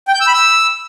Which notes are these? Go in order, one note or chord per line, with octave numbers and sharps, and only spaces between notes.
G5
G6
E6
B5
E6